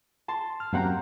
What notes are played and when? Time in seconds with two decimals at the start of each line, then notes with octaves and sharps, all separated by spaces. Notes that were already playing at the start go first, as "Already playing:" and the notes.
0.28 A5 C6
0.60 F6
0.73 F#2 A#3 C4 G4 F#5 A#5